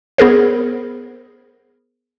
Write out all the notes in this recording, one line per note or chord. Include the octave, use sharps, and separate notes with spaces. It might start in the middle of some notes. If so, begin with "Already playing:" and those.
B3 G#4 A#4 C5